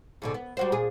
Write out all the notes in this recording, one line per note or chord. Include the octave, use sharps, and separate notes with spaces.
G#2 B2 D3
B3
G3 F#4 C5
A#2 G#4